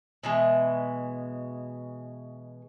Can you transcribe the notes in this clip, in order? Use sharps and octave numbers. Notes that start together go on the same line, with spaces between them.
B2 E3 G#3